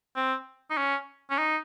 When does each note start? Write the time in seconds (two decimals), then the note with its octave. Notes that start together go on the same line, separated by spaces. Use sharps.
0.16 C4
0.71 D#4
0.77 C#4
1.30 C#4
1.38 D#4